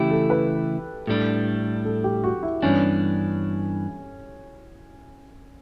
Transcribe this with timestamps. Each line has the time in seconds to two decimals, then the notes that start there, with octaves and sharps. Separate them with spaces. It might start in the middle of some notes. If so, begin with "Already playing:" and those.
Already playing: C#3 E3 A3 E4 G4
0.11 A4
0.30 B4
1.07 A2 G3 D4 A4
1.85 A4
2.04 G4
2.24 F#4
2.43 E4
2.62 G2 E3 B3 C#4 D4